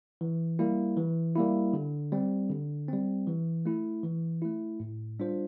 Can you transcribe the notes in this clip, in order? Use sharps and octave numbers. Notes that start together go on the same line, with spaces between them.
E3
G3 A#3 E4
E3
G3 A#3 E4
D3
G3 C4
D3
G3 C4
E3
A3 E4
E3
A3 E4
A2
G3 D4 F4 C5